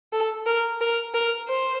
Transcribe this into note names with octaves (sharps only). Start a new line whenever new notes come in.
A4
A#4
A#4
A#4
C5